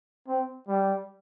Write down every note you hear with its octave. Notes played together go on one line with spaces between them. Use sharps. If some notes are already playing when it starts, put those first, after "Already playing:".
C4
G3